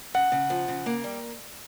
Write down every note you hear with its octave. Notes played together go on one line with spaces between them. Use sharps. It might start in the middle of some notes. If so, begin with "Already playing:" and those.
C#3 F#5
C#3
F3
C#3
A#3
G3